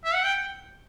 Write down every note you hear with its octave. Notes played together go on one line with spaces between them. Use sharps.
E5
F#5
G5